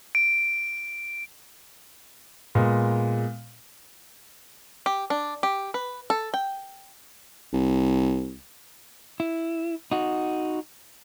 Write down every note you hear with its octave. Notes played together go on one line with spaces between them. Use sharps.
D7
A#2 G#3 B3
G4
D4
G4
B4
A4
G5
C2
E4
D#4 F#4